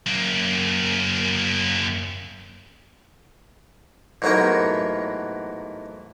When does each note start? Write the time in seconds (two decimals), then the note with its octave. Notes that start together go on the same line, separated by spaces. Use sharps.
0.07 F#2 A#3
4.22 A1 G#2 F#3 A#3 B3 A#4